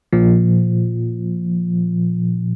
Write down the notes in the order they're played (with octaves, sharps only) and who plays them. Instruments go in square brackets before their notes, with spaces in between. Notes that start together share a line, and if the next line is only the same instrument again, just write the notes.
[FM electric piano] A#2 F3